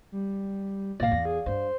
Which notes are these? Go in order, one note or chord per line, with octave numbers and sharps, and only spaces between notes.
G3
G#1 A#2 D5 F5 A#6
E2
G#4
G2 C5